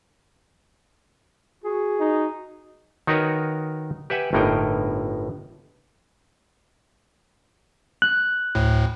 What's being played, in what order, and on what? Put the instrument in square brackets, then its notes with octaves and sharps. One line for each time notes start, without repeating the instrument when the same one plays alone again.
[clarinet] F#4 [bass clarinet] G#4
[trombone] D#4
[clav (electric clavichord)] D#3 D#4 F#4 A#4 B4 C#5
G4 B4 E5 F#5 G#5
G1 A2 A#3 D#4 A#4 G5
[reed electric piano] F#6
[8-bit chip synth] D2 A2